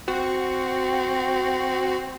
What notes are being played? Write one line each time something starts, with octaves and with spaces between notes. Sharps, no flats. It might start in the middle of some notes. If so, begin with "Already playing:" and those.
C4 F#4